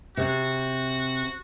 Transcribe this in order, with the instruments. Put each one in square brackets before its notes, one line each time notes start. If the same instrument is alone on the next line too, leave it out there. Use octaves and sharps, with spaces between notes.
[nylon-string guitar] C3 [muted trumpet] F#4